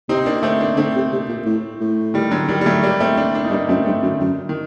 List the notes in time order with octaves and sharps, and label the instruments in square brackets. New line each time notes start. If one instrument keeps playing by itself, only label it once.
[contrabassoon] C3 [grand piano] C4 D#4
[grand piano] A#3 D4
A3 C4
A#3 D4
[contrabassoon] D3 [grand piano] A3 C4
[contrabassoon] C3
C3
A#2
A2
A2
[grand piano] D#3 G3
D3 F#3
D#3 G3
G3
F#3 A3
G3 A#3
A3 C4
A#3 D4
A#3 D4
D#4
[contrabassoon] G2 [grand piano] A#3 D4
[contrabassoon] F#2 [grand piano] A3 C4
[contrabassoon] G2 [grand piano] A3 C4
[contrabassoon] F#2 [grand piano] D3
[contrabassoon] F#2 [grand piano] D#3
[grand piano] D#3